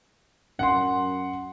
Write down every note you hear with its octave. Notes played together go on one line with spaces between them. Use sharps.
F#2 F#5 C6